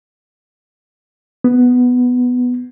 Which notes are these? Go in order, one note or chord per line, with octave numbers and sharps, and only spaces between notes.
B3